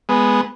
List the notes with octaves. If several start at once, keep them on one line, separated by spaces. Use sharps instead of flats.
G#3 B3